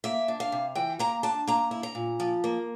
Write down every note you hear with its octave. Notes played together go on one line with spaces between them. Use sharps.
A#3 E5
D4
F5
C3
E3 G5
A#3 A#5
D4 A5
A#3 A#5
E4
A#5
A#2
F3
A#3